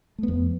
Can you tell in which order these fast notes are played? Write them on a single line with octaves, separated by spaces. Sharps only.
A3 B3 F2